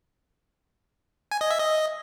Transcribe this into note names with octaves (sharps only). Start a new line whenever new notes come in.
G#5
D#5
E5
D#5